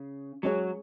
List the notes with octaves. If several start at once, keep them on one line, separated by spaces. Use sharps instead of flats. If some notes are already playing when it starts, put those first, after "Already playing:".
Already playing: C#3
F#3 G#3 C#4 G#4 C#5